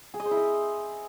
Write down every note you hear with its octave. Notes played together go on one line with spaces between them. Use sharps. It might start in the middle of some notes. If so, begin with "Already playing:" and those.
G#4
D#5
C5
E4
D#5